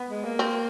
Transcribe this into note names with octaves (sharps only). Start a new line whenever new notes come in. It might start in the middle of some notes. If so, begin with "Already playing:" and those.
Already playing: B3
G#3
A#3
C4